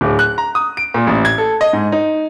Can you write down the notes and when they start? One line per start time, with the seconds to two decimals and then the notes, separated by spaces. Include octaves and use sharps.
0.01 D1
0.19 F#6
0.38 A#5
0.55 D#6
0.77 D7
0.94 A#2
1.07 A1
1.25 G#6
1.38 A4
1.61 D#5
1.73 G#2
1.92 D#4